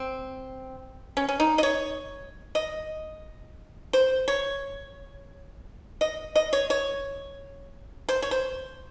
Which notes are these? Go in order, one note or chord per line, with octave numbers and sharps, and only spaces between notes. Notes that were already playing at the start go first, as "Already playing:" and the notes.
Already playing: C4
C#4
C#4
D#4
D#5
C#5
D#5
C5
C#5
D#5
D#5
C#5
C#5
C5
C#5
C5